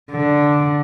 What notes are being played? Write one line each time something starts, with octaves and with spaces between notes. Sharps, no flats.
D3